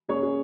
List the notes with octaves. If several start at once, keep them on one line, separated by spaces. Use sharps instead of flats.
C#3 A#3 C#4 G#4 C#5
G#4